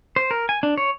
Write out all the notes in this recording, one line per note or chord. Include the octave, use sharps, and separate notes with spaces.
C5
A#4
G#5
D4
C#5